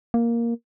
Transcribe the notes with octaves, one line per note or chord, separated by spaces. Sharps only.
A#3